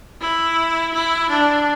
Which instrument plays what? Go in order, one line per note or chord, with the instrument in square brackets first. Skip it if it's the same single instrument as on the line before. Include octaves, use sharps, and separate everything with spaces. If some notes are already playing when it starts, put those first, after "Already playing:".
[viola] E4
E4
D4